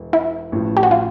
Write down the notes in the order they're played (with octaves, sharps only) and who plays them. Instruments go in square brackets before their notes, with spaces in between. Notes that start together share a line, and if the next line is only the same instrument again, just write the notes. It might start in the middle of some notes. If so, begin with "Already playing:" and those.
Already playing: [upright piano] E1
[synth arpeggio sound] E4
[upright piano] A1 A2 F3
[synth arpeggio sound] G4
F#4
F4